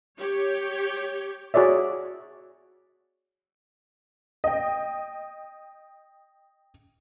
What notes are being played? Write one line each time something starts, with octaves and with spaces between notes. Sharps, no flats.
G4 C#5
F#4 G#4 C#5 D5 E5
D#5 G5